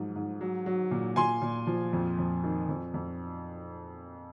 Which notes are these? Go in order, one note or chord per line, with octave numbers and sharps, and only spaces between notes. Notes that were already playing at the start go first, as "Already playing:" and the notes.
Already playing: G#2 F3 F#3
G#2
F#3
F#3
A#2
A#2 G#5 C6
A#2
F3
F2
F2
D#3
F2
F2